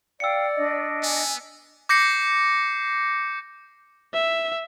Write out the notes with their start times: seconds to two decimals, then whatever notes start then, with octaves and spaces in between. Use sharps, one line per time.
0.20 D5 F5 G5 E6 C#7
0.55 D4 D#5
1.03 B3 G#5
1.89 D6 G6 A#6 C7 C#7
4.13 E5